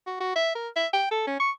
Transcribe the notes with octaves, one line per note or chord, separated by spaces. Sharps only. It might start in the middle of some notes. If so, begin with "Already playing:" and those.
F#4
F#4
E5
A#4
E5
G5
A4
C#4
C#6